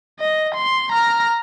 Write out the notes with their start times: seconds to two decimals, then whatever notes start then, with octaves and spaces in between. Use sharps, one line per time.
0.20 D#5
0.55 C6
0.92 A#5 F6